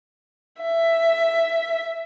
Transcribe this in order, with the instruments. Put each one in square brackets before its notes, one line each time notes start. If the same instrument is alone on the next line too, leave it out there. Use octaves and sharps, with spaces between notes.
[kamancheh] E5